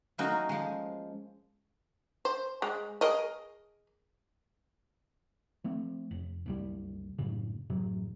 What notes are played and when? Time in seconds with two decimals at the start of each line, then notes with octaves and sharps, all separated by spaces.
0.18 F#3 A3 A#3 C#4 D#4 F#4
0.49 F3 G#3
2.25 C5
2.62 G#3
3.01 G#4 A#4 D#5
5.64 F3 A3 C4
6.11 F1
6.46 F#1 C2 G3
7.19 F#2 A2 C#3
7.70 A1 F#2 C3 F#3